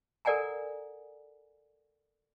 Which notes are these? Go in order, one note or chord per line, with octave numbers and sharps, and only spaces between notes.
A4 A#4 D5 F#5 G#5 A#5